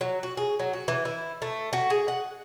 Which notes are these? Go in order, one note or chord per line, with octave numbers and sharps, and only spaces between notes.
F#3
F#4
G#4
F#3
F#4
E3
E4
A3
F#4
G#4
F#5